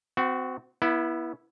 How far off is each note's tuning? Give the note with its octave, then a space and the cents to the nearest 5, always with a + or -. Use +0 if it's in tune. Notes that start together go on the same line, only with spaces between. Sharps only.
C4 -30 F#4 +0
B3 -25 E4 +0